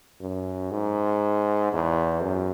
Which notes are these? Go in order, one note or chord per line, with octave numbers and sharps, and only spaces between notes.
F#2
G#2
E2
F#2